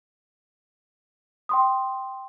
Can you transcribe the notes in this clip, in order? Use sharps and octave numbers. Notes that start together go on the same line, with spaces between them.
G5 C6 D#6